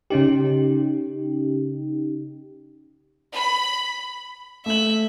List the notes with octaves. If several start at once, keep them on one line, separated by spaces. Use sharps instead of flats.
C#3 C#4 D#4 G4
B5
A3 E5 F#7